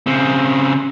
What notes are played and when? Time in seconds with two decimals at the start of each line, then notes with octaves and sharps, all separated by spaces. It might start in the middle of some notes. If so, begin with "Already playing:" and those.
0.07 C#3 C4